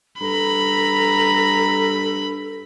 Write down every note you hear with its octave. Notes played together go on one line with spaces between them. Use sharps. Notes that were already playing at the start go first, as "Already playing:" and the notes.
G2 A4 A#5 B5